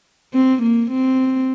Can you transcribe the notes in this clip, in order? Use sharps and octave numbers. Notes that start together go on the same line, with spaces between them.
C4
A#3
C4